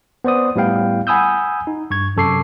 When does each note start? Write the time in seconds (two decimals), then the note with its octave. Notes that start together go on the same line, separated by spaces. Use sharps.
0.24 B3 C5 D5 D#6
0.56 A2 G3 B3 E4 F5 G5
1.07 F#5 G#5 B5 D#6 E6 G6
1.67 D#4
1.90 G2 C#6 G#6
2.17 F#2 C3 A4 C#6 D6 C7